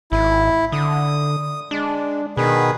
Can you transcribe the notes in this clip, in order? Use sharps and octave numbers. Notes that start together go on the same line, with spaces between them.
G#1 E4
D3 D#6
G#3 D4
B2 D#3 G#4 B4